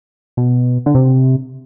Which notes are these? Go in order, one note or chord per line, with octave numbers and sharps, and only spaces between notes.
B2
D3
C3